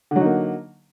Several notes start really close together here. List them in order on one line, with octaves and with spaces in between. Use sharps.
D3 F#3 D#4 A#3